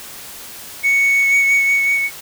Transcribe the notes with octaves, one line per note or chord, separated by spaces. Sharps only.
C#7